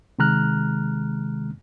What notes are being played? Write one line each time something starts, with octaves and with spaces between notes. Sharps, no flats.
C3 D#3 G#3 A#5 F6 F#6